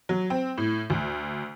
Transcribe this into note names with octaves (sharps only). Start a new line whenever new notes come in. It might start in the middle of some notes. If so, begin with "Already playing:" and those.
F#3
C4
A2
D2